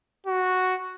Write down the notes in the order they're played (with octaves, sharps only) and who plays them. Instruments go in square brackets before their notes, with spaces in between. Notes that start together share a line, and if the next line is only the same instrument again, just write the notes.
[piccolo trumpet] F#4